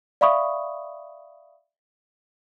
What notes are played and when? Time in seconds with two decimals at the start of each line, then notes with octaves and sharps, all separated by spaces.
0.21 D5 E5 F5 B5 C#6 D#6